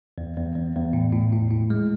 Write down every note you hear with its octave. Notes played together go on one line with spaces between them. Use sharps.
E2
E2
E2
E2
A2
A2
A2
A2
G#3